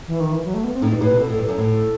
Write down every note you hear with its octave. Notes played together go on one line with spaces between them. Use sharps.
E3
D#3
E3
F#3
A3
B3
C4
A2 D#4
G2
A2 B4
C3
B2 A4
A2
A4
G2
F#2 A4
A2